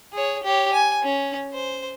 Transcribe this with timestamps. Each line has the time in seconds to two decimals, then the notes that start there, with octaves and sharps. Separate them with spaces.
0.13 G#4 C#5
0.43 G4 C#5
0.73 G#5
1.03 C#4
1.54 C5